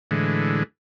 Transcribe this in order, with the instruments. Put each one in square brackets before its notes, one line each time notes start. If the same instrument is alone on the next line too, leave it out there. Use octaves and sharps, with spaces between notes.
[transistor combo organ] A2 D3 E3 G#3